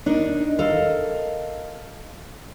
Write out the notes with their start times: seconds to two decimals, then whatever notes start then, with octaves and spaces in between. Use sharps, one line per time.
0.06 D4 D#4 A#4
0.59 A4 A#4 D#5 F5